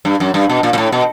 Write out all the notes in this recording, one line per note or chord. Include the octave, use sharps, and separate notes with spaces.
G2
F#2
G2
B2
A#2
A#2
A2
B2